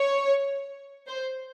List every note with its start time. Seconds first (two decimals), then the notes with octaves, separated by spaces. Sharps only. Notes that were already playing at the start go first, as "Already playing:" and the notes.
Already playing: C#5
1.08 C5